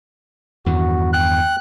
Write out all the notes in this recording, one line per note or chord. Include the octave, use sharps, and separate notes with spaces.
E2 G2 D#3 F#4
G5 F#6